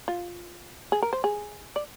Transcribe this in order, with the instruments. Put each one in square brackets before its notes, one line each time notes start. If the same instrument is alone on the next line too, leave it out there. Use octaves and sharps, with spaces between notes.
[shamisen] F4
G#4
A#4
C5
G#4
D5